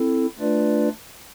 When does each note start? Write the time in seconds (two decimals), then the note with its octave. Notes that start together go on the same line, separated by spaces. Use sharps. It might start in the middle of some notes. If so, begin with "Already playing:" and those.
Already playing: C4 E4 A4
0.39 A3 D4 F4 B4 D5